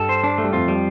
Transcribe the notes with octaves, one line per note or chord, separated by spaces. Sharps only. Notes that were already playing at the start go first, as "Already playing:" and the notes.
Already playing: G2 G3 A4
C5
D4
A3
G3
F2 F3 F4
G3